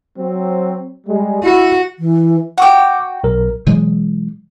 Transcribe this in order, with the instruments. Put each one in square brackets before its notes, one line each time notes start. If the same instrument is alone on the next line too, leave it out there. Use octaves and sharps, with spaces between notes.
[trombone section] F#3 C4
G3 G#3
[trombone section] E4 [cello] F#4
[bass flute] E3
[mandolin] F#4 G5 [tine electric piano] F#5 C#6 D6
[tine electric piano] B1 A#4
[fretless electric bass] B2 E3 F#3 G#3